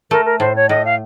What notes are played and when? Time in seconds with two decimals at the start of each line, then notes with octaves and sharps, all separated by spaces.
0.11 A3 A#4
0.25 A#4
0.40 A2 C5
0.56 C#5
0.69 A2 D#5
0.85 F5